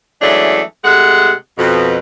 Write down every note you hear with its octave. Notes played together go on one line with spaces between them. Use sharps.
E3 F#3 G#3 A3 C#4 D4
C3 G#3 A3 F#5
F2 B2